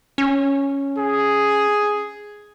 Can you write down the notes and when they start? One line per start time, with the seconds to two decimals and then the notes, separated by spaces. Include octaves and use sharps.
0.18 C#4
0.98 G#4